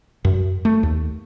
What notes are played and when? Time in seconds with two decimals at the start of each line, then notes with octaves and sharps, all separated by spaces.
0.25 F#2
0.65 A3
0.83 D#2